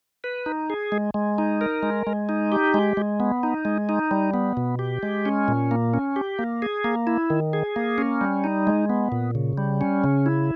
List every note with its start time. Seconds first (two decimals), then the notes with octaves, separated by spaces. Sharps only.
0.24 B4
0.46 D#4
0.70 G#4
0.92 G#3
1.14 G#3
1.38 D#4
1.61 A#4
1.83 G#3
2.07 G#3
2.29 D#4
2.52 G4
2.74 G#3
2.97 G#3
3.20 B3
3.43 D#4
3.65 G#3
3.89 D#4
4.11 G3
4.34 B3
4.57 B2
4.79 G4
5.03 G#3
5.26 C#4
5.48 A#2
5.71 A#3
5.94 C#4
6.16 G4
6.39 A#3
6.62 G#4
6.84 A#3
7.07 E4
7.30 D#3
7.53 G#4
7.76 A#3
7.98 C#4
8.21 G3
8.44 D#4
8.67 G#3
8.89 B3
9.12 A#2
9.35 C#3
9.58 G3
9.81 C#4
10.04 C#3
10.26 E4